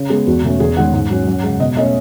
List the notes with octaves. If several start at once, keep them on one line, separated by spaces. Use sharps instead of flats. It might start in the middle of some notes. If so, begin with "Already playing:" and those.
Already playing: C#3
G#3 B3 G#4
E2 F#4
B2 A3 C#4
E2 G#4
D#3 G#3 C#4 F#5
G#2
F#3 C#4
F#2
C#3 G#3
B2 D#5
A3 C#4 D#5